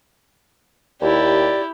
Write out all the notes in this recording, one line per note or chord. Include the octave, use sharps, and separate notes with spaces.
D#2 E4 G4 D5